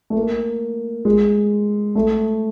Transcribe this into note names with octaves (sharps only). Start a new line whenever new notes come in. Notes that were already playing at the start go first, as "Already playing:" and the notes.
A3
A#3
G#3
A3